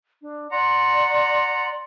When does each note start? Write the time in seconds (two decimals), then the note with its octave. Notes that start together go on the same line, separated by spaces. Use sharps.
0.22 D4
0.51 D5 F#5 A#5 C6